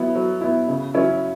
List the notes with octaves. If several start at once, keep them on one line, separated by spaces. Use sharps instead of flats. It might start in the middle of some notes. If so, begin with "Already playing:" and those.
Already playing: F#3 B3 E4
F#3
B3 E4
C#3
F#3 C#4 E4